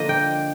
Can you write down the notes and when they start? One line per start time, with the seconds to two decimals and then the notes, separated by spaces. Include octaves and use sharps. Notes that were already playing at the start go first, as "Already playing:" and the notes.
Already playing: D3 F3 A#3 D4 D#5
0.09 G5